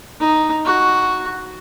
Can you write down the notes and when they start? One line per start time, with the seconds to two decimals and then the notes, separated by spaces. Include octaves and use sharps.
0.20 D#4
0.65 F#4